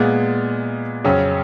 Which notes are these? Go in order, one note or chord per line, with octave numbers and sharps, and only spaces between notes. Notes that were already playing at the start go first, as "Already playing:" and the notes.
Already playing: A#2 G#3 B3
F2 C#3 F#3 C#4